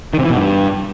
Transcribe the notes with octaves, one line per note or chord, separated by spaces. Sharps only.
D#3
C3
E3
B2
G2